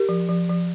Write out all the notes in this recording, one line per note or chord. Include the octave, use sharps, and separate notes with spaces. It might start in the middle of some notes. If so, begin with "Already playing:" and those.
Already playing: G4 A#4
F3
F3
F3